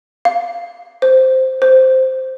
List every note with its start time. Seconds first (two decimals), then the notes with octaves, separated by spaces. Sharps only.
0.25 F5
1.02 C5
1.62 C5